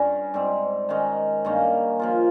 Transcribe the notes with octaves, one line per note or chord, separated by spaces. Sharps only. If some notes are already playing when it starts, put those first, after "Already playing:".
Already playing: G2 G3 C#4
G#2 G3 C4
D#3 G#3 C#4
G2 D#3 A#3 C#4
F3 A#3 F4